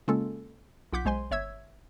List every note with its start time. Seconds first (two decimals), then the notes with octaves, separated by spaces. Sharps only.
0.08 C#3 G#3 A#3 C#4 F4 A4
0.93 B1 F4 F#5 D6 G6 B6
1.05 B1 G#3 C5 G#5 C6
1.31 G1 C#5 E5 E6 G#6